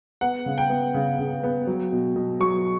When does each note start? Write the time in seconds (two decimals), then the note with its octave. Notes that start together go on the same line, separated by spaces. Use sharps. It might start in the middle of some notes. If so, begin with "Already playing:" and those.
0.21 B3 F#5
0.46 C#3
0.58 G5
0.70 B3
0.94 C#3
1.19 C#3
1.43 B3
1.67 F#3
1.92 B2
2.16 B2
2.40 F#3 C#6